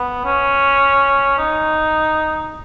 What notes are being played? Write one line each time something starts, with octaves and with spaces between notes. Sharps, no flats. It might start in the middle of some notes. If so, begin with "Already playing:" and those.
Already playing: B3
C#4
D#4